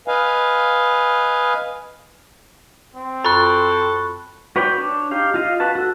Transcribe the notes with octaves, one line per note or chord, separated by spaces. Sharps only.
B4 D#5 F5 G#5
C4
F#2 F4 A4 B5 C#6 F#6 A6
F#4 B4 C#5 D5 G5
D4 C#5
D#4 G4 F5
F4 D#5 F5
F#4 B4 A5
F#4 A4